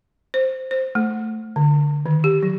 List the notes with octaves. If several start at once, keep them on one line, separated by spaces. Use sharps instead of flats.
C5
C5
A3
D3
D#3
G4
F#3